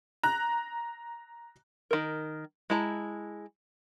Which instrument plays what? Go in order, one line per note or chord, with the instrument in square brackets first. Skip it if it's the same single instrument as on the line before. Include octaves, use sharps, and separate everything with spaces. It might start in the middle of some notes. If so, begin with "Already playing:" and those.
[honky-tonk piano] A#5 F#6
[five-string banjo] D#3 A#4
G#3 E4 A5 A#5